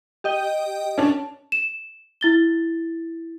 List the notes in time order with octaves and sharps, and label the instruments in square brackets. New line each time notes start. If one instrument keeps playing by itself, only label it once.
[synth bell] G4 D#5 G5
[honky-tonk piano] C#4 D4
[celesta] E7
E4 A6 G7